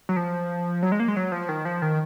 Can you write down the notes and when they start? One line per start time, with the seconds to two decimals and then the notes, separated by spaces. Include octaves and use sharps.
0.09 F#3
0.16 F3
0.83 F#3
0.92 G#3
1.00 A#3
1.08 G#3
1.17 F#3
1.32 F3
1.49 D#3
1.65 F3
1.82 D#3